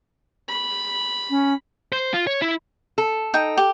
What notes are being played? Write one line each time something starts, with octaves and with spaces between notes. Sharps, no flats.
B5
C#4
C5
F4
C#5
E4
A4
D#4 G5
G4